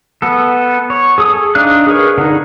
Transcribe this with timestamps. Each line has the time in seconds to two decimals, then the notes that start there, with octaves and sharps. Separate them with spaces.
0.22 B3 A4
0.90 C#5
1.18 G#4 A4 D#6
1.55 D4 D#4 F5 F#6
1.87 G#4 A#4 B4 C#5
2.18 D3 D#4